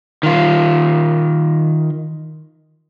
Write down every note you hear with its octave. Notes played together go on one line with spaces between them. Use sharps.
D#3 F4